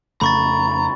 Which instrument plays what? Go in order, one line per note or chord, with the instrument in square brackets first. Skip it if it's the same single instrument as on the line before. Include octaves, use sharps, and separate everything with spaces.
[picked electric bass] F2 C#3 A3 [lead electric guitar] A#5 [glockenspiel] B5 C#6 A6